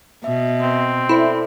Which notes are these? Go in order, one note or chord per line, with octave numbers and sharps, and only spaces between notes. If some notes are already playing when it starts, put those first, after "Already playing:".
B2 E5
C4
E4 A4 C5 D5